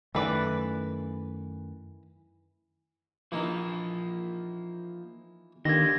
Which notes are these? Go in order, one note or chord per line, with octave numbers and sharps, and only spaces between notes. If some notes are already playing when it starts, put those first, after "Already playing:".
F#2 D#3 E3 A3 B4 D5
E3 F3 A#3 D#4
D#2 D3 D#3 G#6 A#6